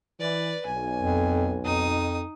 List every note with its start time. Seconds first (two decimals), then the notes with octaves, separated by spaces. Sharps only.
0.20 E3 B4 D5
0.66 B1 G#5
1.00 F2
1.65 F2 D#4 D#6